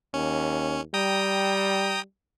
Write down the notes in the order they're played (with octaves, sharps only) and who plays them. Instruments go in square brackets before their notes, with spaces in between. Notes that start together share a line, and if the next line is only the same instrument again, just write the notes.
[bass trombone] D#2 [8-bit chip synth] C#4
[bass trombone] G3 [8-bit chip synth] G5 A#5 D#6